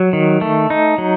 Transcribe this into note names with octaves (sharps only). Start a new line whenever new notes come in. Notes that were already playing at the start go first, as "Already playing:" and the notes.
Already playing: F#3
D#3
A3
D#4
F#3